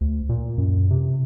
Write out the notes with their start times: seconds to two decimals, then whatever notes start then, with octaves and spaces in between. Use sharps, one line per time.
0.01 D2
0.29 A#2
0.58 F#2
0.91 C3